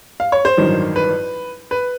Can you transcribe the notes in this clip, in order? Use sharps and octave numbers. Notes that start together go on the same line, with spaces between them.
F5
C#5
C5
A1 G2 D#3 F#3
B4
B4